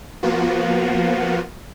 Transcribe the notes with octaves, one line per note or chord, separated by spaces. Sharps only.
F3 A#3 B3 F4 F#4